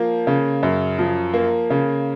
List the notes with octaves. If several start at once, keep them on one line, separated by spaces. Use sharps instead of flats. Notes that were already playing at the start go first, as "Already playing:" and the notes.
Already playing: F3 A#3
C#3
F#2
F3
A#3
C#3